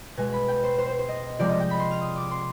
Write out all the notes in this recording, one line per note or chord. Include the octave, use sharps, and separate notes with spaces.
B2 G#3 G#5
B5
G5
C5
C5
C5
C5
D#5
C3 F3 G#3 D5
D#5
G5
B5
C6
F6
D#6
D6
C6